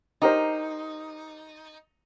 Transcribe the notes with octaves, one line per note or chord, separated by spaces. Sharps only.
D#4 G4 A#4 C5